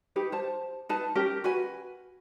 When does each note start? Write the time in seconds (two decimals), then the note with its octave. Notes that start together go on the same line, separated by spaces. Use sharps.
0.16 D#4 G4 B4
0.32 C5 A5
0.89 D#4 B4 A5
1.15 C#4 G4 A#4
1.44 F#4 B4 G#5